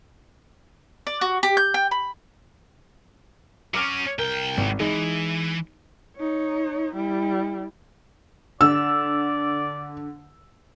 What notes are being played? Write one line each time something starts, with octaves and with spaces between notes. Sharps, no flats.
D5
F#4
G4
G6
G5
B5
F#3 C#4 D6 F6 D7
C2 A#4 G5 G7
G#1
E3 G#3 D#4
D#4 C#5
G3 E4
D3 D5 E6